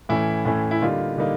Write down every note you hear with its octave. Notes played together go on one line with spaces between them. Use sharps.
A2 E3 A3 C#4 E4
A2 E3 A3 C#4
E4
D3 G3 A#3 D#4 F4
D3 G3 A#3 D#4